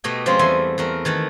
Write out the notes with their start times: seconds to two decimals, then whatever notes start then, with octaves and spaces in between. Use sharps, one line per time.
0.04 B2 A3 G4 D#5 G#5
0.26 F3 G#3 C4 C#4 F4 G#4
0.39 E2 G3 A3 E5 G#5 C6
0.78 E2 A3 A#4
1.05 D#3 E3 A3